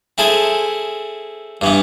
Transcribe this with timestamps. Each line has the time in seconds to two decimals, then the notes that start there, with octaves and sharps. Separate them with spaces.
0.18 C4 E4 G#4 A4
1.61 G2 E3 B3